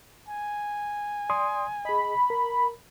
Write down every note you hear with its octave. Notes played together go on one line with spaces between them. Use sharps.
G#5
D5 C6 D#6
G#4 D#5 B5
A#4